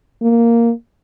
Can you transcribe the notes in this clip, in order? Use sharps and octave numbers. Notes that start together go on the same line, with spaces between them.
A#3